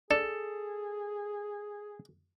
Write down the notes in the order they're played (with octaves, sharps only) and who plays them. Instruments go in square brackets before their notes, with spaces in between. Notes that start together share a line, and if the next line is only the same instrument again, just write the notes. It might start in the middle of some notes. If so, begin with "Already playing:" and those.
[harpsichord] D4 [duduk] G#4 [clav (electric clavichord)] A4